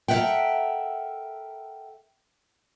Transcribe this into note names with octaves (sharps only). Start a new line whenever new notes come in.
A4 A#4 D5 E5 F#5 G5